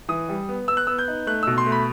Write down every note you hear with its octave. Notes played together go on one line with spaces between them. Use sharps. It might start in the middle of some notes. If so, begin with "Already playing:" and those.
E3 D#6
G3
B3
B3 E6
F#6
B3 E6
G6
D#4
A3 F#6
B2 E6
C6
A3
B5